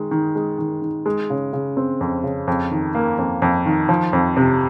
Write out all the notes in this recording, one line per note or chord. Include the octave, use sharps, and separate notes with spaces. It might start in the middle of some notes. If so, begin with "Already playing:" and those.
Already playing: D#3 G#3
D#3
G#3
D#3
D#3
G#3
C#3
C#3
C4
F2
C#3
F2
D#3
A#3
F2
F2
D#3
F3
F2
C3